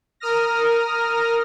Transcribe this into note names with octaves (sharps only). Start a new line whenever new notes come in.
A#4 D#6 F6 A#6